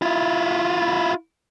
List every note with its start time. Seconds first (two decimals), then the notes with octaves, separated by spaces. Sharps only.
0.02 E4 F4